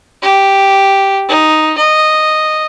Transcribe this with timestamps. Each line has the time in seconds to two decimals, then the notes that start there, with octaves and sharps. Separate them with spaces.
0.22 G4
1.28 D#4
1.77 D#5